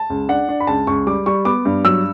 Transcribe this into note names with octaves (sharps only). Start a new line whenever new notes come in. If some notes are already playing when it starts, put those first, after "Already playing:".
Already playing: A5
C#2
D4 F#5
D4
B5
C#2 A5
C#2 C#6
G3 D6
G3 C#6
B3 D6
G2
F#3 E6